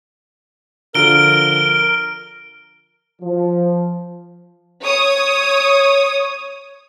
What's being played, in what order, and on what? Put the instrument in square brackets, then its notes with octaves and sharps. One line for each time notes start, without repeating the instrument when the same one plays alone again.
[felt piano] D3 F3 A4 [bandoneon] A#4 [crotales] F6 D7 G7
[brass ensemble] F3
[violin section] C#5 D#6